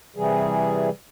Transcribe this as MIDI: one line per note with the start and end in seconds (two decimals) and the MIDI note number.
0.16 0.90 48
0.16 0.90 52
0.16 0.90 55
0.16 0.90 68